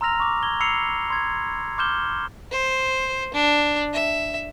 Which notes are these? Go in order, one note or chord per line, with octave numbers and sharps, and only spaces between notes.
A#5 C6 E6 F6 A#6 F7
C#6 D6
G#6 G7
B5 E6 C7 C#7 F7
C6 G#6
C6 D6 F6 G6 E7 G7
C5
D4
E5